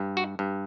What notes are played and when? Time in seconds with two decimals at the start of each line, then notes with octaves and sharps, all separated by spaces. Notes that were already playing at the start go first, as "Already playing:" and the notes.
Already playing: G2
0.17 F#4
0.39 G2